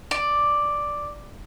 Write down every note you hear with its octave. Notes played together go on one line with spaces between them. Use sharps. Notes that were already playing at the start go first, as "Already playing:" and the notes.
D5